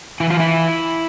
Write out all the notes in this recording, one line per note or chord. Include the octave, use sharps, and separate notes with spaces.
E3 E4
F4
E4